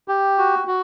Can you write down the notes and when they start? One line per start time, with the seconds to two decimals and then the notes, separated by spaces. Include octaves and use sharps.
0.08 G4
0.38 F#4
0.68 F#4